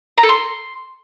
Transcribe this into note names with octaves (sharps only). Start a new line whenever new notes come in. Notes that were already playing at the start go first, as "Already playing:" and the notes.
A#5
A4
C6